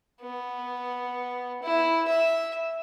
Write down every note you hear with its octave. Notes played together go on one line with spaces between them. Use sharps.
B3
E4
E5